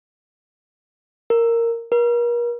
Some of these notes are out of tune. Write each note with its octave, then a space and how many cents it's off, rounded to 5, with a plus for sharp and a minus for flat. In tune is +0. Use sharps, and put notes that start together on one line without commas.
A#4 -10
A#4 +40